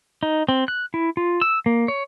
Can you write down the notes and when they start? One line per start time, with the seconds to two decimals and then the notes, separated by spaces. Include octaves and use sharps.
0.23 D#4
0.49 C4
0.68 F#6
0.94 E4
1.17 F4
1.42 E6
1.66 A#3
1.88 C#5